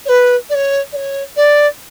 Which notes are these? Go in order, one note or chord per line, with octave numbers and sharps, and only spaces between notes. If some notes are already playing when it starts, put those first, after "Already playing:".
C#5
B4
D5
C#5
D5
C#5
D5